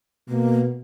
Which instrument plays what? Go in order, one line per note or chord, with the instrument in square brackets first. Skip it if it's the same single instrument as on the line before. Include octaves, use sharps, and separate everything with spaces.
[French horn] B2 [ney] A#3